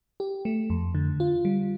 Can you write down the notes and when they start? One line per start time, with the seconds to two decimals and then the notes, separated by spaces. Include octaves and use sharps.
0.20 G4
0.45 A3
0.70 F2
0.95 D3
1.20 F4
1.45 G3